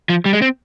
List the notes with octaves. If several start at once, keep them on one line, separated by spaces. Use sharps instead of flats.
F3
G3
G#3
C4